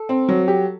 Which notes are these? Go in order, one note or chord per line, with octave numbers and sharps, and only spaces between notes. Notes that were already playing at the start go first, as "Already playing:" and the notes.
Already playing: A4
C4
F#3
G4